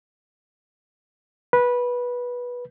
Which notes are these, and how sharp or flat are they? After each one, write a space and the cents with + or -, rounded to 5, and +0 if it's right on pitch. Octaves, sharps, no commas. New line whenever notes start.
B4 -15